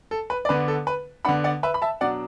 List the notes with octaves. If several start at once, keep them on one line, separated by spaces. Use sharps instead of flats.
A4
B4
D5
D3 B3 D4 B4
A4
B4
D3 B3 D4 F#5 B5
D5 F#5
B4 E5
B5
E5 A5
B2 F#3 D4 D5 F#5